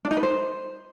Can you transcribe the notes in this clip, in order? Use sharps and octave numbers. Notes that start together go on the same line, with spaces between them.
D4
D#4
B4
C5